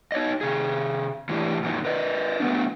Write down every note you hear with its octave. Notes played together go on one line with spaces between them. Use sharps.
D#4 C#5 D#5
C3 G#4
A2 E3 D4 E4 G4
F#2 A#2 D#3 F#3
A#4 B4 D#5
F#3 A3 B3 D4